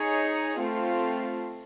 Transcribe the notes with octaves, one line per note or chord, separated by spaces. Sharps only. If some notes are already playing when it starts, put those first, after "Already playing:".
Already playing: D#4 G#4 C#5
A3 C4 F4